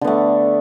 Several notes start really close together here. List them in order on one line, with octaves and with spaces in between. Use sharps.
D3 B3 A3